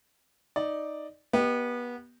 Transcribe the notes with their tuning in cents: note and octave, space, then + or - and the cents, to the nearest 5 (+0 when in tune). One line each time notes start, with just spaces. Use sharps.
D#4 +0 D5 +0
B3 -25 G4 -5 D#5 -5